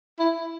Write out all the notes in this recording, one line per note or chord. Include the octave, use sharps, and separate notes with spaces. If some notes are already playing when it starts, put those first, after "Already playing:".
E4